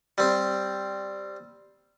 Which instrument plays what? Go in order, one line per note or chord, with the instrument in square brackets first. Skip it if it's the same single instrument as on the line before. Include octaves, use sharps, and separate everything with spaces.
[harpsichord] G3 C4